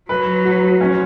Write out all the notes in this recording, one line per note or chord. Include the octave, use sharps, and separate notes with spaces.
F#3 B4
F#4
C#4